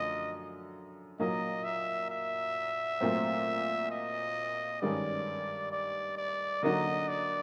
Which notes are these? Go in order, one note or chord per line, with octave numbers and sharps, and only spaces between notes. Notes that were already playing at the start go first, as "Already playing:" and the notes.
Already playing: F#2 D3 F3 A3 D#5
A#2 F#3 A#3 D#4 D#5
E5
E5
A#2 F#3 A3 C4
D#5
G2 D#3 G#3 C#4 D5
D5
D5
D3 F#3 A#3 D#4 F#4 D#5
D5